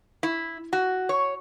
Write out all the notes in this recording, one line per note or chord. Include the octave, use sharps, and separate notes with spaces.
E4
F#4
C#5